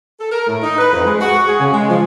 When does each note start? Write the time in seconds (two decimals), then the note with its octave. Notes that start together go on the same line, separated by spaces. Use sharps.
0.20 A4
0.32 A#4
0.47 A2
0.63 D#4
0.79 B4
0.93 F2
1.07 G#3
1.21 F#4
1.47 G#4
1.60 C#3
1.73 G#3
1.89 F3